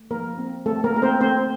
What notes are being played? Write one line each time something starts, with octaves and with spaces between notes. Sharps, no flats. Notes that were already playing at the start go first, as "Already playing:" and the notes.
Already playing: A3
F3 A#3 A#4
C4
A3 C4 A4
A#3 A#4
A3 A#4
C4 C5
A3 C4 C5